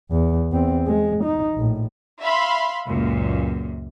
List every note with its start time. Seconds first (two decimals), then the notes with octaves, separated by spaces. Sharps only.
0.11 E2
0.52 E2 C4
0.87 G#3
1.24 D#4
1.54 A#1 A2
2.22 E5 F5 B5 C6
2.85 C#2 F#2 A#2